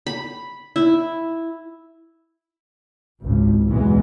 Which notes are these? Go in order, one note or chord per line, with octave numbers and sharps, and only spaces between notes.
B5
E4
G#1 C#2
B1 E2 B2 E3 G#3 B3